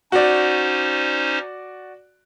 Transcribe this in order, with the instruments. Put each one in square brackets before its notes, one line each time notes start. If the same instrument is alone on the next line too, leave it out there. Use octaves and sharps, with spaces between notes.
[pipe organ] C#4 D#4 C5 [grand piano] F#4 D5